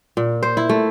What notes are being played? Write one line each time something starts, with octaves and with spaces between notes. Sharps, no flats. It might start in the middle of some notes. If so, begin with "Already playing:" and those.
A#2
C5
E4
A3